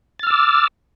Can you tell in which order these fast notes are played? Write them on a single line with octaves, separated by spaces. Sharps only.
A6 F6 E6 D6